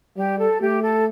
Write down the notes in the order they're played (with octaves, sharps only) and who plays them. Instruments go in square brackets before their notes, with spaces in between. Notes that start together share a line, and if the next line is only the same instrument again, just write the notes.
[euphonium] G3 [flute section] G4
[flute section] A4
[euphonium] A3 [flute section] G4
[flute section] A4